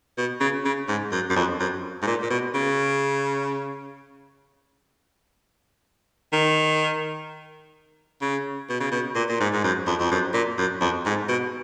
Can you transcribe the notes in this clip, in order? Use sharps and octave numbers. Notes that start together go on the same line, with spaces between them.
B2
C#3
C#3
G#2
F#2
F#2
F2
F#2
G#2
A#2
A#2
B2
C#3
D#3
C#3
B2
C#3
B2
A#2
A#2
G#2
G#2
F#2
F2
F2
F#2
A#2
F#2
F2
G#2
B2